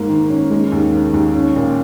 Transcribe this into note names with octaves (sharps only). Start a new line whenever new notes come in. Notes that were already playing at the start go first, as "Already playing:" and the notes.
Already playing: G#2 A#3
D#3
C#4
G#3
D#2
D#3
D#2
C#4
A#2